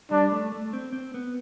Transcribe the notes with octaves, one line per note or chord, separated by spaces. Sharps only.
G3 D4
A3
A3
C4
C4
B3